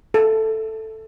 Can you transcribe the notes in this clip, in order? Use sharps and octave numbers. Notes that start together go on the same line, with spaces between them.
A4